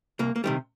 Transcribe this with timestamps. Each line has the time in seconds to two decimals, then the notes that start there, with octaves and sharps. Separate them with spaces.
0.19 C2 A#3
0.36 A#3
0.44 C3 D#3 G3